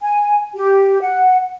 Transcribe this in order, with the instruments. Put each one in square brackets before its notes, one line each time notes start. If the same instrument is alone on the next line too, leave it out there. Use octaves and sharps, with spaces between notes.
[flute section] G#5
G4
F#5